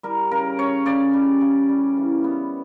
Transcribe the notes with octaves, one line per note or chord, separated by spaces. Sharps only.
G3 A#4
C#3 A#4
C#4 C#5
C#3 D5
G3
C#3
G3
E3
B3